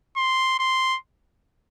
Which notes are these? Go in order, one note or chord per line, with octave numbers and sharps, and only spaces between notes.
C6
C6